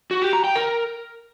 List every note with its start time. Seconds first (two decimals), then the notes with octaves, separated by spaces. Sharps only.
0.11 F#4
0.22 G4
0.33 A#5
0.44 G5
0.55 A#4